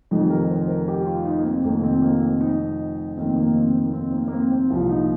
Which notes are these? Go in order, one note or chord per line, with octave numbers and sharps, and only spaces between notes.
F1 F2 D#3 D#4
G4
A#4
C5
A#4
G4
F4
D#4
A#3
C4
F1 F2 D#3 A#3
C4
A#3
C4
D#4
F1 D#2 D#3 C4
A#3
C4
D#4
A#3
C4
A#3
A#3
C4
C4
C2 A#2 F3 C4
D#4